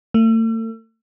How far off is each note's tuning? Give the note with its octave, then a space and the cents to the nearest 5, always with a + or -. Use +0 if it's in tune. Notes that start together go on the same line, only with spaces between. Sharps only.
A3 +40